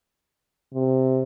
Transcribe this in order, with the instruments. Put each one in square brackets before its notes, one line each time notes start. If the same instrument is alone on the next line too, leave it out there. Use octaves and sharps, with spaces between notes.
[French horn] C3